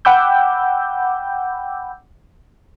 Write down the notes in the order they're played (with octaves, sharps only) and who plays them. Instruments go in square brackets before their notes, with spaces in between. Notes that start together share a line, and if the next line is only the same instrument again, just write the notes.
[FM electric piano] F#5 G5 B5 D6 E6 G6